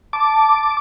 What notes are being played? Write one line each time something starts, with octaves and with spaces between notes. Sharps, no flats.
A5 D6